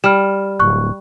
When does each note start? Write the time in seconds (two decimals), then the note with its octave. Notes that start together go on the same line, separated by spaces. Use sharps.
0.04 G3 F6 E7
0.60 D1 C#6 F#6